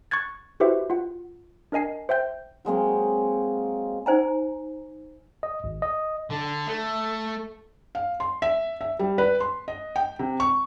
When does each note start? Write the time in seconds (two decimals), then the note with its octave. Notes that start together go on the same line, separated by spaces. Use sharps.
0.11 C#6 F#6 G#6 A6
0.60 E4 F#4 G4 B4 C5 E5
0.90 F4 F#5
1.72 D4 A#4 D#5 G#5 C7
2.09 C5 E5 G5 G6
2.65 F#3 G#3 A#3 C4
4.06 D#4 C5 G#5 A#5
5.43 D#5
5.64 G#1
5.82 D#5
6.30 D3
6.67 A3
7.95 F5
8.20 C6
8.42 E5
8.81 E5
8.99 G3
9.18 B4
9.40 C6
9.68 D#5
9.96 G5
10.19 C3
10.40 C#6